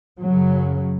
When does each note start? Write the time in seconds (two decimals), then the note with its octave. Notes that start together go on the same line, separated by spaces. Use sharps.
0.20 F#2 C#3 F#3